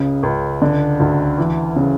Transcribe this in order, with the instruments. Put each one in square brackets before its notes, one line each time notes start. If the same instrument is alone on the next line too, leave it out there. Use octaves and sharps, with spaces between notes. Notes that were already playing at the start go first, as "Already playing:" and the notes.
Already playing: [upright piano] C#2 C#3
C#2
D3
D2
E3
C#3